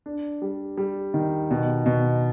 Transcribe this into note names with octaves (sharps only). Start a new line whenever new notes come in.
D4
G3
G3
D#3
B2
B2